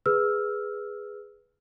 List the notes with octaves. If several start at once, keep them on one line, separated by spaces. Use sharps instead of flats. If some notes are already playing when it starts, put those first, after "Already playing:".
G#4 B4 E6 F6